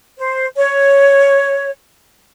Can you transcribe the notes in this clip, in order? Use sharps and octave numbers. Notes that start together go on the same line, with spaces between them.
C5
C#5